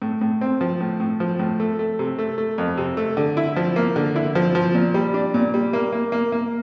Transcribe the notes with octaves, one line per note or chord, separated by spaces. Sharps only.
A2
A2
C4
F3
A2
A2
F3
A2
A3
A3
C3
A3
A3
F2
C3
A3
D3
E4
F3
A#3
D3
E4
F3
F3
A#2
G3
D4
A#2
G3
A#3
A#3
A#3
A#3